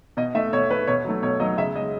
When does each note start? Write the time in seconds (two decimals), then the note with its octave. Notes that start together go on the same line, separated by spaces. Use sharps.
0.17 B2 D#5
0.35 A3 E5
0.53 B2 C#5
0.71 A3 B4
0.87 B2 C#5
1.04 F#3 A3
1.23 B2 C#5
1.40 F#3 A3 D#5
1.57 C#3 E5
1.74 G#3 D#5